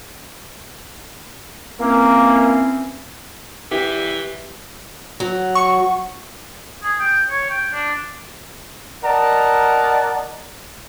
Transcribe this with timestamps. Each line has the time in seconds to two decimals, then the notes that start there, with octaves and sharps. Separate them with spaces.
1.79 E3 A#3 C4 C#4
3.71 E3 G4
5.20 F#3
5.55 C#6
6.83 G#4
7.00 G5
7.30 C#5
7.50 G5
7.73 D4
9.04 A#4 D5 D#5 F#5 A5 A#5